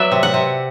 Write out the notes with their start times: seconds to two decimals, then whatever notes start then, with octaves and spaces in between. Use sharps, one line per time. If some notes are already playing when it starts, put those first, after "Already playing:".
Already playing: F#3 B3 D5 E5
0.12 C3
0.23 F#5
0.34 C3